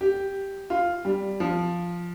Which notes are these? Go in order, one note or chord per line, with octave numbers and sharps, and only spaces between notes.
G4
F4
G3
F3